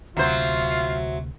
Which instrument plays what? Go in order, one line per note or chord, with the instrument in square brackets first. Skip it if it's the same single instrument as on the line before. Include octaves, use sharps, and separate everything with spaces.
[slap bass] D2 C3 [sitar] F#3 C5 [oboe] F4 [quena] E5